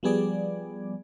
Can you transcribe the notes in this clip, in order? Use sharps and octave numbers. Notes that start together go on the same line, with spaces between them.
F3 G3 B3 G#4 D5